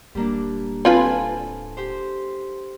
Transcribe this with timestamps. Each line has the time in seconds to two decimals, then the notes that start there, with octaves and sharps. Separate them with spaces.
0.15 D1 G3 A#3 D4
0.85 C4 F4 A4 B4 G#5 A5
1.77 G4 C5